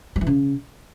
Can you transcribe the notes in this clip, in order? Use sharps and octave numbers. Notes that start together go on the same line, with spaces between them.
G3
E3
C#3